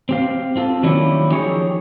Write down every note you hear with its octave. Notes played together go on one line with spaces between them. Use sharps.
C4 G4 F5
C4 F4 A4
D#3 F#3 G3 A#3 C#4 E4
F3 D#4 G4 G#4 C#5